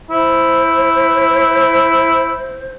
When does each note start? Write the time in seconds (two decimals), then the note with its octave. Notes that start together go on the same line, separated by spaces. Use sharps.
0.10 E4 C5